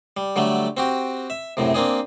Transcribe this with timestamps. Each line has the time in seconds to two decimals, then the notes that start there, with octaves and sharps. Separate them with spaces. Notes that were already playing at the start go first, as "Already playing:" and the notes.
0.17 G3
0.36 D3 F#3 G3 A3
0.77 C4 F#4 G4
1.30 E5
1.57 F#2 A2 C3
1.74 A#3 C4 D4 G#4